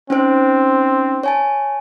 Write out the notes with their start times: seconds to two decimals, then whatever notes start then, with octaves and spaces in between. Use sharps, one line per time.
0.10 C4 C#4 D#4 C5
1.23 C#5 G#5 A5